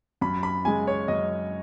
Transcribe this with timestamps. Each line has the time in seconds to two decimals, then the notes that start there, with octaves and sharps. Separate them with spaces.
0.21 F#2 B5
0.43 B5
0.65 C#3 G#3 G#5
0.87 C#5
1.08 F#2 D#5